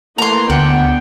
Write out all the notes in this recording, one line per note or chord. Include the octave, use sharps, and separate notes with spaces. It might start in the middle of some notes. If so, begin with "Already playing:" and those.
E3 A3 A#3 A#5 C6
D2 B3 D4 F#5 G5